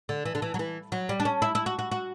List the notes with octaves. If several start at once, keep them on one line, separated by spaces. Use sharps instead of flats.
D3
E3
D3
E3
F#3
E3
F#3
G3
D4
C#4
E4
E4
F#4
F#4
F#4